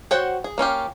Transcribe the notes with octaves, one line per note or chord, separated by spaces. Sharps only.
F#4 C5 C#5 F#5 G5
G#4
A#3 C#4 F4 G4